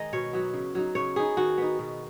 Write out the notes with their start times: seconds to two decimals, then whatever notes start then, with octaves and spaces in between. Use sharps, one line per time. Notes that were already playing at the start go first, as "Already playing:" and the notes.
Already playing: D#3 G#3 D#4 D#5
0.13 B2 C#5
0.33 F#3 B3
0.53 C#3
0.75 F#3 D#4
0.95 C#3 C#5
1.16 B3 D#4 G#4
1.37 D#3 F#4
1.58 B3 D#4
1.79 B2